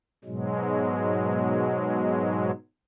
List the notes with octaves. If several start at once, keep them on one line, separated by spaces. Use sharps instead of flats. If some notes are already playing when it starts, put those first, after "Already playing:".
G#2 B2 F#3 G#3